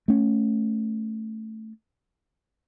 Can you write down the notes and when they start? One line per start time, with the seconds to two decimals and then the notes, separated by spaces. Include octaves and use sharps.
0.08 A3 C#4